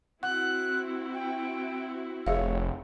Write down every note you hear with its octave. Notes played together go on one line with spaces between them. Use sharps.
C4 E4 F#4 F#5 F#6
G5
F1 G#4 C#5 E5 F5